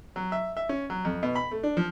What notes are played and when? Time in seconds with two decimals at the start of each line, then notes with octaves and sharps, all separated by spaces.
0.16 F#3
0.32 E5
0.57 E5
0.69 C#4
0.90 F#3
1.05 F2
1.23 B2
1.36 B5
1.51 A3
1.63 D4
1.77 F3